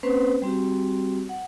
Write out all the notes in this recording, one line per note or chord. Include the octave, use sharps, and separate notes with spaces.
A#3 C4 C#4 B4 C5
G3 C4 F#4 G4
F#5